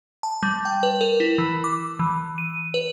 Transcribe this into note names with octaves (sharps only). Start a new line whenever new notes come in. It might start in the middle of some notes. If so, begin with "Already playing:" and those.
A5
G3
G5
B4
A#4
E4
E3
D6
E3
D#7
B4